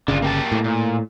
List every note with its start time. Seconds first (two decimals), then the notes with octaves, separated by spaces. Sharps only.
0.08 G1 C#3 D4 F4
0.22 A#3 G4 A5
0.52 A2
0.64 A#2